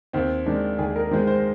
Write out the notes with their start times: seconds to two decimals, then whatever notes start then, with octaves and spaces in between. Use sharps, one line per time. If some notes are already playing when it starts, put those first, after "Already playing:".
0.13 D#2 C4
0.46 D#3 G#3 D4
0.79 D#2 G#4
0.96 A#4
1.11 D#3 G#3 C5
1.27 C5